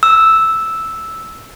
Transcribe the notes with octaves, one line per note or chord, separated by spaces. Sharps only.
E6